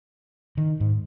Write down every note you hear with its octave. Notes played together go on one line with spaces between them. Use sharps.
D#3
G#2